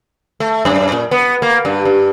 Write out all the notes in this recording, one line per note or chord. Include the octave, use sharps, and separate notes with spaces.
A3
F#2
A#2
B3
A#3
G2
G2